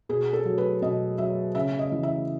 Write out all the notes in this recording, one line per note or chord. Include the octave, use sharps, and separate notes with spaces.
B2 G#4
A4
F#3
B4
B2 D#5
F#3 E5
C#3 E5
D#5
E3
E5